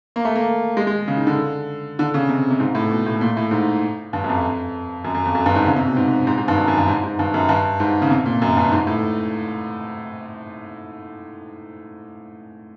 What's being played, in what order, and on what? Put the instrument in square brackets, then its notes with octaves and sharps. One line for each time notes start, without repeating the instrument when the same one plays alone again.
[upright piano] A#3
A3
A#3
G#3
G#3
C#3
D#3
D3
D3
C#3
C3
C3
G#2
A2
B2
A2
A#2
A2
G#2
G2
F#2
F2
F#2
F#2
F2
F#2
G2
G#2
C#3
C3
B2
G#2
G#2
G#2
G2
F#2
F#2
G2
G#2
G#2
G2
F#2
G2
G#2
C#3
C3
A#2
F#2
G2
G#2
A2